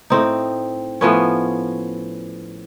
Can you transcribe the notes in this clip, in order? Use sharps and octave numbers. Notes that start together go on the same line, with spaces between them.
A2 C4 D#4
A2 F3 B3 C#4